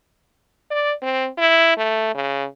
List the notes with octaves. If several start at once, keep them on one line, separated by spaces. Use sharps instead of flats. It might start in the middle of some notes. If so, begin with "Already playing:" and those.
D5
C4
E4
A3
C#3